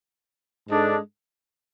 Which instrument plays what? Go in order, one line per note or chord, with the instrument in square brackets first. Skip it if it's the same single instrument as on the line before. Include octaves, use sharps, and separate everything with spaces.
[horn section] G#2 G#3 D4 A4